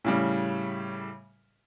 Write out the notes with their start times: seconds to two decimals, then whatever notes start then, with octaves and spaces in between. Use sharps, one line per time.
0.04 A2 C#3 G3